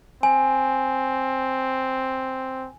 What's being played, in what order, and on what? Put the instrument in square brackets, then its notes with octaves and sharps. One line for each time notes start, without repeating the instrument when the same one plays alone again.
[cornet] C4 [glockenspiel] G#5